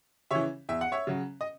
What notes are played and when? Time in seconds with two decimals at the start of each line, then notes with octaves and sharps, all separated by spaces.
0.31 C#3 E3 C#5 E5
0.69 E2 E5
0.81 F#5
0.92 C#5 E5
1.07 C#3 F#3
1.41 D#5